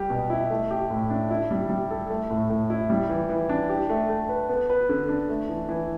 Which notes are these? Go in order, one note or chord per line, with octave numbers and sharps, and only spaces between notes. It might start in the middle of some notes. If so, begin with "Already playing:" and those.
Already playing: G3 G4
B2
E4
A3
G4
A2
D4
E4
G3
G3
A4
A3
A2
A2
E4
G3
E3
E3
D4
G4
A3
A3
B4
B3
B4
D3
D4
A3
E3
E3